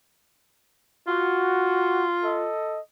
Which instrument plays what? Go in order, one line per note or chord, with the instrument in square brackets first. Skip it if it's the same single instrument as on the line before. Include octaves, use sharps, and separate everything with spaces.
[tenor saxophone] F4 [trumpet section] F#4
[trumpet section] A4 D#5